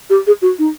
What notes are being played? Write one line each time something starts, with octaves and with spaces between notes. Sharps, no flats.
G4
G#4
F#4
D#4